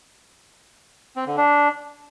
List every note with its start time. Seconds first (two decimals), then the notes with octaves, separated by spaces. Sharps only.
1.16 C4
1.27 D3
1.37 D4